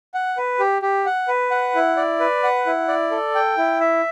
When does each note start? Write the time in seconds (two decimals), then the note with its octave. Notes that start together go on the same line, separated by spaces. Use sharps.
0.14 F#5
0.37 B4
0.60 G4
0.82 G4
1.06 F#5
1.28 B4
1.51 F#5
1.75 E4
1.97 D5
2.20 B4
2.43 F#5
2.66 E4
2.88 D5
3.11 A4
3.35 G5
3.57 E4
3.80 E5